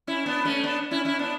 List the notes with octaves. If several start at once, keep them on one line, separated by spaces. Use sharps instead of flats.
C#4 E4
B3 D4
A3 C#4
B3 D4
C#4 E4
C#4 E4
B3 D4